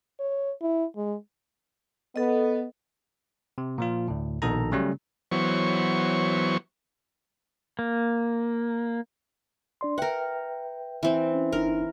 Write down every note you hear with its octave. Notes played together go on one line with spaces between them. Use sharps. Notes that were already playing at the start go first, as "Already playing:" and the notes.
C#5
E4
G#3
B3 A4 D#5
C3
A#2 F3 F4
D2 A2
A#1 B2 D#3 A4 A#5
C#3 F#3 G3 A3 C#4
E3 F#3 B3 C5 C#5 C#6
A#3
D4 D5 C6
A#4 B4 E5 F#5 G5
E3 C4
C#4
G1 D4 D#4 A#4